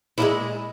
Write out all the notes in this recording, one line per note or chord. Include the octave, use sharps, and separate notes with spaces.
A#2 F3 G#3 E4